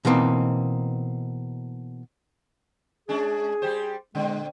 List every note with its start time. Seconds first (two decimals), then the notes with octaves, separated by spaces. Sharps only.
0.05 B2 E3 A#3 C4 D#4
3.09 G#3 C#4 D4 G#4
3.62 G3 G4 C5
4.15 A#2 D3 G#3 C4